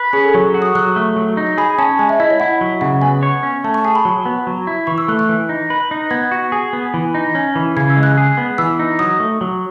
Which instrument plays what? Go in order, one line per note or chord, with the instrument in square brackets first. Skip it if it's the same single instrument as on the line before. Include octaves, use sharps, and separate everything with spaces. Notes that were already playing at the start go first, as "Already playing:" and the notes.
Already playing: [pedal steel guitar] B4
[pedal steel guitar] C#4 [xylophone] G#4
[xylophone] A4
[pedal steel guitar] F#3 [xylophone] C#5
[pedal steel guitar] F#4
[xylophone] D#6
[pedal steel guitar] F#3 [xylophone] F#6
[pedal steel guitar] A3
F#3
D#4
[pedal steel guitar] G#4 [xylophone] B5
[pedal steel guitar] C#4 [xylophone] A5
[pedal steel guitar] G#3 [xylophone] G#5
[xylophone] E5
[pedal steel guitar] E4 [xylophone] D#5
[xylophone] C#5
[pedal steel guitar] E4 [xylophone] F#5
[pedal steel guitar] F#3
[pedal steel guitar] C#3 [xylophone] F#5
[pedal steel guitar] B3 [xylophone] G#5
[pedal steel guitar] C#5
C#4
[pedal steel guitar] A3 [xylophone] A5
[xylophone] C#6
[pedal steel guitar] G#4 [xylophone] A5
[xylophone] B5
[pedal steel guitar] F#3
B3
F#3
E4
[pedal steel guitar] E3 [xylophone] C#6
[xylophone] E6
[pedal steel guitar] A3 [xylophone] F#6
[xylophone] F#6
[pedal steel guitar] E3
D#4
B4
D#4
[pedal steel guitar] B3 [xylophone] G#6
[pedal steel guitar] F#4
G#4
B3
E3
D#4
C#4
E3
[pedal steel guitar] C#3 [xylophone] G#6
[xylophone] E6
[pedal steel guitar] G#3
[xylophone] F#6
[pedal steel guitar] G#4
B3
[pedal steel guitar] E3 [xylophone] E6
[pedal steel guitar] D#4
[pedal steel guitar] F#3 [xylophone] D#6
[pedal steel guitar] A3
F#3